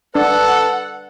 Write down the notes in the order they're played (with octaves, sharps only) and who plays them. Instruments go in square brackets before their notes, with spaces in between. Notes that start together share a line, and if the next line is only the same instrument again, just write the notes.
[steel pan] D4 [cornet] A4 [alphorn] B4 [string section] F#5